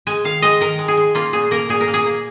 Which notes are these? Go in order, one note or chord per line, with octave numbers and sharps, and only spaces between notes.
G#3 G#5
D#3 F5
G#3 D#5
D#3 A#4
G#3
G#4
G#3
A#3 F4
A#2 G#4
A#3 A#4
A#2 G#4
A#4
A#3
G#4
A#3